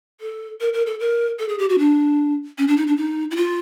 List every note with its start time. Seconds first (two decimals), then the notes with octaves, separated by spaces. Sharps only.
0.20 A4
0.61 A#4
0.73 A#4
0.86 A4
1.00 A#4
1.39 A4
1.48 G#4
1.59 G4
1.69 F#4
1.78 D4
2.58 C#4
2.68 D4
2.77 D#4
2.87 D4
2.97 D#4
3.31 E4
3.36 F4